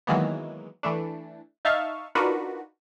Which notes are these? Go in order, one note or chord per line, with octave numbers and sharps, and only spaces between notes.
D#3 E3 F#3 G#3 A#3 B3
E3 A3 D4
D#4 E5 F5 A5 C#6
D4 D#4 F4 F#4 A#4 B4